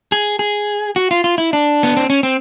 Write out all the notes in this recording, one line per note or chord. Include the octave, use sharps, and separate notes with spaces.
G#4
G#4
F#4
F4
F4
E4
D4
B3
C4
C#4
C4